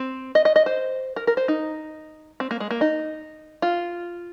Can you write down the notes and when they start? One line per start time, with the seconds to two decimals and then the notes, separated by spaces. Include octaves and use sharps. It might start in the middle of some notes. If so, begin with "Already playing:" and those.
Already playing: C4
0.35 D#5
0.45 D#5
0.56 D#5
0.66 C5
1.16 A#4
1.27 A#4
1.37 C5
1.48 D#4
2.40 C4
2.51 A#3
2.60 G#3
2.71 A#3
2.81 D#4
3.62 F4